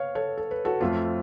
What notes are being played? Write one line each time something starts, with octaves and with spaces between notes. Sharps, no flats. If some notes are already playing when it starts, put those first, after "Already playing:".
Already playing: B3 C#5 F5
A4 C#5
A4
B4
F#4 A4
F2 F3 A3 F4